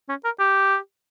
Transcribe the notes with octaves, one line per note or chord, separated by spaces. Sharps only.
C#4
A#4
G4